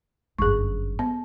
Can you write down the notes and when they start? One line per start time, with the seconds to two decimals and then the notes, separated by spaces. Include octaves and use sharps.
0.39 G1 F#2 G#4 C#6
0.99 B3